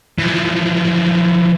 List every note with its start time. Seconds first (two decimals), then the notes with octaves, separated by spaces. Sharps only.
0.19 E3 F3